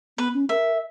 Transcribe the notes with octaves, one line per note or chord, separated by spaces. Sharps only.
B3 B4
C#4
A#4 E5